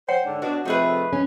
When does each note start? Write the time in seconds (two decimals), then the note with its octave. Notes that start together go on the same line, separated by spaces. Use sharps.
0.09 C5 C#5 F#5 G5
0.25 G#2 D3 D4
0.42 B2 D4 F#4
0.65 C3 F3 A3 D#4 G#4 B4
1.13 C#4